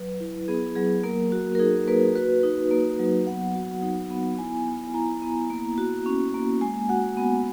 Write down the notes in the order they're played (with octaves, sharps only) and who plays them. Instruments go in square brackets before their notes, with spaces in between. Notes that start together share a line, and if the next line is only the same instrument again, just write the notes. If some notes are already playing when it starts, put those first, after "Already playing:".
Already playing: [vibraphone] F#3 B4
E4
B3 G#4
F#3 G#4
A#3 A#4
F#4
A#4
D#4 G#4
A#3 B4
F#4 B4
D#4
A#3
F#3
B3 F#5
F#4
D#4
B3
E4 G#5
B3
E4 A#5
B3
A#3
F#4
C#4
A#3
G#3 G#5
F#4 F#5
B3